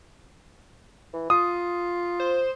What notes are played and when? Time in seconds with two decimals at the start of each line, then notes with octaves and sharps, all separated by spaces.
1.13 E3
1.30 F4 D#6
2.20 C5